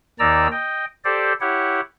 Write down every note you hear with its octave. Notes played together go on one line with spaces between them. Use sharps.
D#2 D#3 D#4 D5 A#5 E6
D#5 G5
G4 A4 C5 D5
E4 G4 C#5 F#5